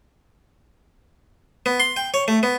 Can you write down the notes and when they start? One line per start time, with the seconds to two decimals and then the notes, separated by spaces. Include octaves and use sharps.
1.66 B3
1.80 C6
1.96 G5
2.14 C#5
2.28 A3
2.43 B3